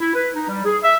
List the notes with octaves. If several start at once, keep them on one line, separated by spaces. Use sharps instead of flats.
E4
B4
D#4
G3
G#4
E5